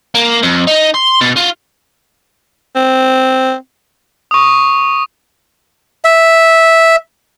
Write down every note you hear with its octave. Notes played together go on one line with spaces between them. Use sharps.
A#3
F2
D#4
C6
B2
F4
C4
C#6 D#6
E5